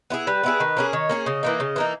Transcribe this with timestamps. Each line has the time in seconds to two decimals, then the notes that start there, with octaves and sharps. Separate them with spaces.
0.10 B3 E4 G#4
0.27 G3 B4
0.43 B3 E4 G#4
0.60 D#3
0.77 A#3 C#4 G#4
0.93 D#3 C#5
1.10 A#3 C#4 G#4
1.26 C#3 D#5
1.43 E3 A#3 D#4
1.60 C#3
1.76 E3 A#3 D#4